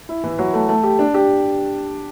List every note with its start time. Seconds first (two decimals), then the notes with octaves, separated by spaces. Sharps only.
0.09 E4
0.24 E3
0.39 F#3
0.54 A3
0.69 A3
0.83 G4
0.99 D4
1.14 G4